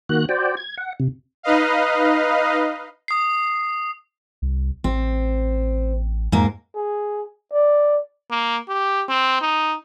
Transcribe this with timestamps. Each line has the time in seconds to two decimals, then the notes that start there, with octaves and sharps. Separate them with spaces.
0.09 D#3 A#3 F#4 F#6
0.29 F#4 C5 D5 G5
0.57 G#6
0.77 F#5
1.00 C3
1.43 D#4 B4 D#5 F5
3.08 D#6 C7
4.42 C2
4.84 A1 C4
6.32 F2 G#2 A#3
6.75 G#4
7.53 D5
8.31 A#3
8.69 G4
9.09 C4
9.42 D#4